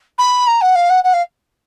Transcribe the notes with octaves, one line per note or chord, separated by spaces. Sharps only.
B5
A#5
F#5
F5
F#5
F#5
F5